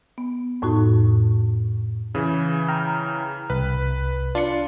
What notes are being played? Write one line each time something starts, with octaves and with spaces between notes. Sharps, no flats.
B3
F2 A2 D#4 F#4
C#3 E3 G#6
G5 A#5 F6
C2 B4
D4 F4 C#7